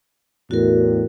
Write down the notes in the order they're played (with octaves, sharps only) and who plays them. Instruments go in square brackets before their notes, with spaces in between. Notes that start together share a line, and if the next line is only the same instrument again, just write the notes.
[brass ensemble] E2 A2 [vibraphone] F#4 A#4